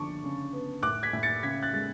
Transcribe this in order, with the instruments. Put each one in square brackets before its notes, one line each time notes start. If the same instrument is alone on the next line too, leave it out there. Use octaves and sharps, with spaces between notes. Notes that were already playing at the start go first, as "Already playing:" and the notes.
Already playing: [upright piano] D3 F3 A5 C#6 D6
C#3
B3
A2 D6 F#6
G#6 B6
A2
A6 C#7
C#3 G#6 B6
F#6 A6
G#3 A6